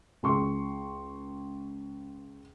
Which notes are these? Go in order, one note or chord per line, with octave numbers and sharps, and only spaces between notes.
C#2 C6 C#6